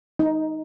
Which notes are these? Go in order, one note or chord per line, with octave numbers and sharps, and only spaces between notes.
D#4